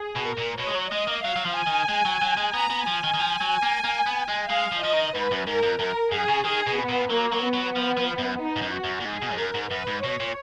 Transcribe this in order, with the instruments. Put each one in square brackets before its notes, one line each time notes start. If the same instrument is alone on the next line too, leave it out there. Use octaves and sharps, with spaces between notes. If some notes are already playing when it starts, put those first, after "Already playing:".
Already playing: [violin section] G#4
[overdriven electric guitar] B2
[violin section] A#4
[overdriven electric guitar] A#2
[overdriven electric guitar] B2 [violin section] C#5
[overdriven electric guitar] G#3
F#3
[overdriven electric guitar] G#3 [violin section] D#5
[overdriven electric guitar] A#3
[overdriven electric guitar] F#3 [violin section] F5
[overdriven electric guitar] F#3
F3
[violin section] G#5
[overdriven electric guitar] D#3
G#3
F#3
F#3
G#3
[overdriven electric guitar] B3 [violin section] A#5
[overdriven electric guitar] B3
[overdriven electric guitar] F3 [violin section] G#5
[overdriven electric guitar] D#3
D#3
F3
F#3
A#3
A#3
B3
G#3
[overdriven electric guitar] G#3 [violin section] F5
[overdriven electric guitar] F3
[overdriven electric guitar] F3 [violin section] D#5
[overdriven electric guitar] D#3
[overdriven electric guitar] G#2 [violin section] B4
[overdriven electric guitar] F#2
[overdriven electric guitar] G#2 [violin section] A#4
[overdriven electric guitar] F2
[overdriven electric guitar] F#2 [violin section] A#4
[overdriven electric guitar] F#2 [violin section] G#4
[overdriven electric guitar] C#3
[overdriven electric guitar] D#3 [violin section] G#4
[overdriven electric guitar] B2
[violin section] B3
[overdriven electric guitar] A#2
[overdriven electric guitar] F#3 [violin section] A#3
[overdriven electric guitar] F#3
[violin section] B3
[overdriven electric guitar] F#3
F3
F3
F#2
[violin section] D#4
[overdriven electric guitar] G#2
F#2
[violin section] F#4
[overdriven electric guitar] F#2
A#2
[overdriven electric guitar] G#2 [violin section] G#4
[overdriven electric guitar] B2
F2
[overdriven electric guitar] F#2 [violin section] A#4
[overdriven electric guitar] G#2
[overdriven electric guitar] F#2 [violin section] B4
[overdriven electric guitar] G#2
[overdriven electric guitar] B2 [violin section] C#5
[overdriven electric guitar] A#2